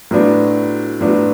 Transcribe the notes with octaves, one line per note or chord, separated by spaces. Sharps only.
A2 F#3 B3 D4 F4
A2 F#3 B3 D4 F4